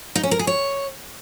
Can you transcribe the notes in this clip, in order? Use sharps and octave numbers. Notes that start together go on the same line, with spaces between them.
D#4
C#4
A#4
G#4
C#5